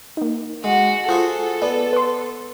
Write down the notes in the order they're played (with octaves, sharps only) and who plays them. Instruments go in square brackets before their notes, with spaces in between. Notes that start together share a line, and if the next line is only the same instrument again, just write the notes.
[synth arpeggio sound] A#3 D#4
[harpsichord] G#3 [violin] F#4
[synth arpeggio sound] F4 [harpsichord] F#4 G#4 C5 [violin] A4
[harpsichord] B3 [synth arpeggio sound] D5
[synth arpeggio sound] B4 C6